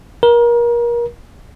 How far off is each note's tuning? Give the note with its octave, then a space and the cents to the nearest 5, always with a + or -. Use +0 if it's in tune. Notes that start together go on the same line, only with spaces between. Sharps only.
A#4 +30